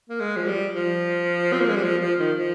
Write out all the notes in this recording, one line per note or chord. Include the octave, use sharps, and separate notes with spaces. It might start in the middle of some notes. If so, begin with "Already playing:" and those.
A#3
G#3
F3
G3
F3
C4
A#3
G#3
G3
F3
F3
D#3
F3